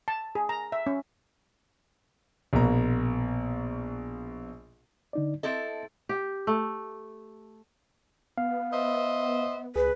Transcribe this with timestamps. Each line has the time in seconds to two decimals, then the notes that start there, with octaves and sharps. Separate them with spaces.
0.08 A5
0.35 G#4
0.49 A#5
0.72 E5
0.87 C#4
2.53 A#1 B2 A#3 A#5
5.13 D3 D#4 D5
5.43 C4 E4 A4 D#5
6.09 G4
6.47 A3
8.38 B3 F5
8.71 C5 D#5 E5
9.76 C#2 G#4 B4